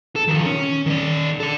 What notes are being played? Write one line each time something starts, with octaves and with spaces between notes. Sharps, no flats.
A4
D#3 F3
C#4
D#3 D5
A4 D5